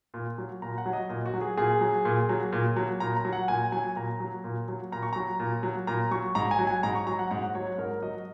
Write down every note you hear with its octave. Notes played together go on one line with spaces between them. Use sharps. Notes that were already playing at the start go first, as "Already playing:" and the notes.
A#2
F#3
A#2 A#5
F#5
F#3
D#5
A#2
F#4
F#3
G#4
A#2 G#4
F#3
A#2
F#3
A#2
F#3
A#2 A#5
A#5
F#3
F#5
A#2 G#5
F#3 G#5
A#2 A#5
F#3
A#2
F#3
A#2 A#5
C#6
F#3 A#5
A#2
F#3
A#2 A#5
F#3 C#6
G#2 A#5
G#5
F#3
G#5
G#2 A#5
C#6
F#3 A#5
F#5
G#2 F#5
F#3 C#5
G#2 A#4
F#3 D#5